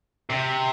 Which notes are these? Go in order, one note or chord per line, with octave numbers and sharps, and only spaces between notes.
C3